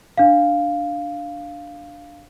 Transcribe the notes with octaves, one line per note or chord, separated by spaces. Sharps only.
D4 F5